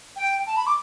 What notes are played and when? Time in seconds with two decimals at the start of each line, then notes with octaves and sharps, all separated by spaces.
0.16 G5
0.47 A5
0.57 B5
0.67 D6